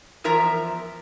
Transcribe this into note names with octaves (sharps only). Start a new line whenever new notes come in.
E2 F3 A#4 E5 A#5